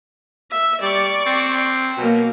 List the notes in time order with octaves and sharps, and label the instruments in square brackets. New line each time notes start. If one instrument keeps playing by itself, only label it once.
[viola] E5
[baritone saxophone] G3 [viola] D5 C#6
[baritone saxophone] C4
[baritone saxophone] B2 [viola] F#3 A#3